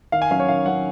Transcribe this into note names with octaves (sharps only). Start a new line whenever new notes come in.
D#3 F5
G#5
F#3 C#4 F5
C#5
D#3 F5
F#3 C#4 F#5